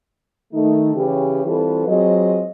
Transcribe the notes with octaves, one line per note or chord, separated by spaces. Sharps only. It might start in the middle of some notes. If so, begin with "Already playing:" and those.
D#3 A3 D#4
C#3 E3 C#4 G4
E3 G3 C4 F4 A4 B4
F#3 G#3 C4 F4 D#5